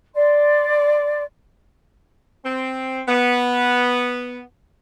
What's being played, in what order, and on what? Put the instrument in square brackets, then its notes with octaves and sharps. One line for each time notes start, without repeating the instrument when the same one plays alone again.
[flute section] D5 C6
[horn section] C4
B3